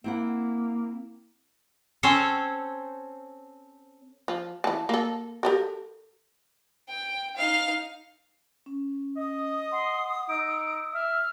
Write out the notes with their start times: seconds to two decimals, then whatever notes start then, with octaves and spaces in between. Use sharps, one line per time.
0.04 A#3 C4 E4 F#5
2.03 C4 C#4 A4 C5 C#5
4.28 F3
4.64 E3 A5
4.89 A#3 A4
5.43 G4 A4 A#4
6.88 G5
7.37 D#4 F5
8.66 C#4
9.17 D#5 D#6
9.72 F#5 C6
10.29 D#4 E6 D7
10.94 E5 F6